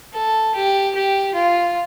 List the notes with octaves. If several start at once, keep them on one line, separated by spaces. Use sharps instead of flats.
A4
G4
G4
F4